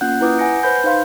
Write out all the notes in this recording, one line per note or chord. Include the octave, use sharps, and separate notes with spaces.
A#3 C#4 F4 F#5 F#6 G6
E4 B4 D6 D#6 G6
F#5 G#5 G6 A#6 C#7 D7
B4 C5 B5 G6
D#4 C5 F5 C6